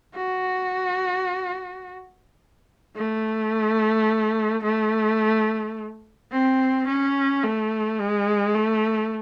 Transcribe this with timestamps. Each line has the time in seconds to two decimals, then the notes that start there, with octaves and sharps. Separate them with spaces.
0.16 F#4
2.96 A3
4.63 A3
6.32 C4
6.87 C#4
7.43 A3
8.00 G#3
8.55 A3